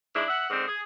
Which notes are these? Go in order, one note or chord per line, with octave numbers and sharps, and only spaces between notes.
G#2 D4 E4
E5 F#5
G#2 D3 C4
G#4